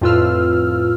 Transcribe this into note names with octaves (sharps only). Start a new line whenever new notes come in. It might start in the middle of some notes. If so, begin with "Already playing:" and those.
F2 A2 F4 B4 E6 F6